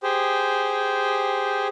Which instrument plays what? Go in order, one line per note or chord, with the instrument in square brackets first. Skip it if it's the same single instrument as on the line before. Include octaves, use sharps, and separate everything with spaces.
[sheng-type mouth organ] G4 G#4 C5